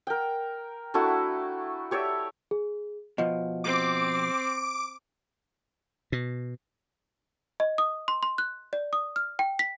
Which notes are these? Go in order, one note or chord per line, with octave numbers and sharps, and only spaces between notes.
A#4 G5
A3 D4 E4 F#4
G4 C#5 D5 E5
G#4
B2 F3 D#5
C4 D6
B2
D#5
D#6
C6
C6
F#6
D5
D#6
F6
G5
B6